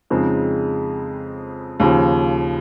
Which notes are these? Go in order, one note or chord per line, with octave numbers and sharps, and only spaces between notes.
F2 C#3 G#3 C4 D#4
D#2 C#3 F3